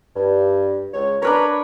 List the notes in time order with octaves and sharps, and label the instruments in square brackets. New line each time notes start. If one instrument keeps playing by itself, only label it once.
[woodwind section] G2
C#2 C#5
[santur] D4 A#4 C#5 [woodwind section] B4 A#5